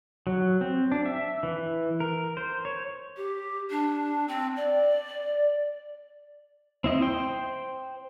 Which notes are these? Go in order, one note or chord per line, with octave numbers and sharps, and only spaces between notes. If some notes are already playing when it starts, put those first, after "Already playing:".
F#3
C4
D4
E5
E3
A#4
C5
C#5
G4
D4
C4
D5
C4 E4 D#5
C5 G5 C6